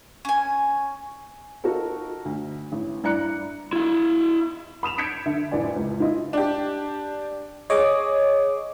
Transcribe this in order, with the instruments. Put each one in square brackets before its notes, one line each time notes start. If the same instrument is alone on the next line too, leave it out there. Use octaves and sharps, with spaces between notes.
[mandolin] C#4 G#5
[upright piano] D#4 F4 F#4 A4 A#4
D2
A1
G2 E4 D5 A#5 F#6 C#7
[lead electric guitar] E4 F5
[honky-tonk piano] B5 D#6 E7 F7
G6 G#6 B6 C#7 D7
D3 E5
A1 F2 D5 G#5
C#2
E4 F4 D#5
D4 G4
[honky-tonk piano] G#4 [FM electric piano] C#5 D#5 D6